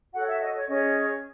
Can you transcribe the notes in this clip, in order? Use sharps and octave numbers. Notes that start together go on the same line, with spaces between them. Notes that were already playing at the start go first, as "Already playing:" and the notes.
F#4 A4 C#5 F#5
E5
D#5
C#5
C#4 G#4 C#5 D#5